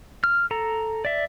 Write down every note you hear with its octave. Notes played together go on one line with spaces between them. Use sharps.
F6
A4 A#5
D5 E5